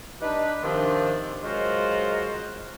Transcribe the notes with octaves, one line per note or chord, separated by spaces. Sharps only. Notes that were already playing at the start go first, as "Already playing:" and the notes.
D4 D#4 G4 B4
C3 D#3 F3 C4 D4
F#3 G#3 F4 F#4 A#4 C5